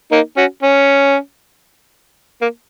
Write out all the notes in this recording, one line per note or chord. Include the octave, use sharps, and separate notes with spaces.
A#3 D#4
C#4 F#4
C#4
A#3